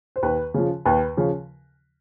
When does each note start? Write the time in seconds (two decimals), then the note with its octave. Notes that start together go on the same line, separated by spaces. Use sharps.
0.16 C5
0.23 D#2 B4
0.54 C#3 F3
0.85 D#2 B4
1.17 C#3 F3